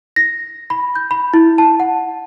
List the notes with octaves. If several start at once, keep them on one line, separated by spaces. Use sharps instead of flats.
A#6
B5
G6
B5
E4
A5
F#5